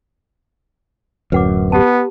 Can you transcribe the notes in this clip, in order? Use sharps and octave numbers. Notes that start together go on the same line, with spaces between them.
D1 F#2 B4 F#5 D6
B3 G4 A5